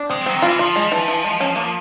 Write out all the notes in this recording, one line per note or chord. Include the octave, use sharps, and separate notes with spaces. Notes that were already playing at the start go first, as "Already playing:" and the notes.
Already playing: D4
G#3 C4
F3
F#3 C4
D#3
E3 F4
F3 F4
G#3
E3
E3
G#3
C#4
A#3